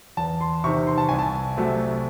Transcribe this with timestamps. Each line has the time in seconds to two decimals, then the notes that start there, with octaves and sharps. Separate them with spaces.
0.17 E2 A5
0.41 C6
0.64 C3 D#3 C#6
0.87 C6
0.98 A5
1.09 C2 G#5
1.19 A5
1.57 C3 F#3 A3